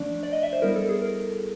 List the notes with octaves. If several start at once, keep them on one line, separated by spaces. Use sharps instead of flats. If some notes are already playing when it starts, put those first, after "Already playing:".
Already playing: F3 A3 D4 D5
D5
D#5
E5
C5
G3 B3 E4 A#4
A4
G#4
A#4